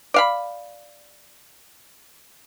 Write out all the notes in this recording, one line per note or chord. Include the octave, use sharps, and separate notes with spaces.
D5 F5 B5